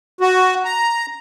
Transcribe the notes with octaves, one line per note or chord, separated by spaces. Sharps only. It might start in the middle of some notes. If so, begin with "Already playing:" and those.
F#4
A#5